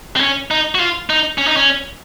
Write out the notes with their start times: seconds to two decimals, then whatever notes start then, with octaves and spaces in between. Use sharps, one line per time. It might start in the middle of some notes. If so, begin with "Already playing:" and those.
0.16 C4
0.21 C#4
0.51 D#4
0.75 F#4
0.80 F4
1.10 D#4
1.38 C#4
1.47 D#4
1.57 C#4